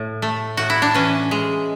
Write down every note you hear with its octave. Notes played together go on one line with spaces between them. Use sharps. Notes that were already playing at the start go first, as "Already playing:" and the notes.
Already playing: A2
A3
A2 F#4
E4
D4
E3 C#4
G#3